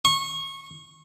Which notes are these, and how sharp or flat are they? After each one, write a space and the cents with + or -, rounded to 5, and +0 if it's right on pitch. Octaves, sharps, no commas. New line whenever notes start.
C#6 -25